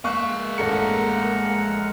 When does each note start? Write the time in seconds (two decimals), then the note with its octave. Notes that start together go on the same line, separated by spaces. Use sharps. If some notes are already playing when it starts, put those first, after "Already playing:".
0.04 G#3 A#3 E5 F5 C#6 F#6
0.58 A1 A4 A#4 F#5 A#5 C#7